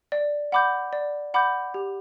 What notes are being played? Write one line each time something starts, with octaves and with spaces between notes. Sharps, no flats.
D5
F#5 B5 D6 G6
D5
F#5 B5 D6 G6
G4